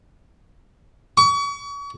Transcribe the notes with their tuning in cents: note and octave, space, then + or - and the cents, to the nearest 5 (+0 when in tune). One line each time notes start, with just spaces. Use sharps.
C#6 +40